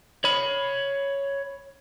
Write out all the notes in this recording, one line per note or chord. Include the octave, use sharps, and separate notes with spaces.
C#5 B5